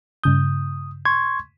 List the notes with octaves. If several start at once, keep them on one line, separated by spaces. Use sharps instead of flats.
G2 C#3 D#6 G6
C6 C#6 G#6